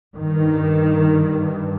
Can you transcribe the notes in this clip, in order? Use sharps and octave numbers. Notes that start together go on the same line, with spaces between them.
G2 D#3